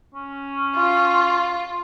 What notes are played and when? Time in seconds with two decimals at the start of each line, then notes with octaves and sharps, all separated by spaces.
0.15 C#4
0.75 F4